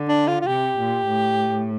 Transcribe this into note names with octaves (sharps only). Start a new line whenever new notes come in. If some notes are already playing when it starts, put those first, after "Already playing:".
Already playing: D3
D4
F4
F4
C3 G4
A#2
A2